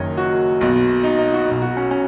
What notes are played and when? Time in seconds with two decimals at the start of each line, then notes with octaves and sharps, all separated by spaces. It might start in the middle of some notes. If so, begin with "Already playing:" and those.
Already playing: F#1 F#2 D#3 C#5 D#5
0.17 F#4
0.61 B1 B2
1.04 D#4
1.19 D#4
1.33 F#4
1.47 B1 B2
1.62 F#4
1.77 C#4
1.91 C#4